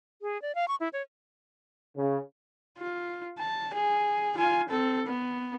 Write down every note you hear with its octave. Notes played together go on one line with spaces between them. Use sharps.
G#4
D5
F5
C#6
E4
C#5
C#3
F4
A5
G#4
F4 G#5
C4 A4
B3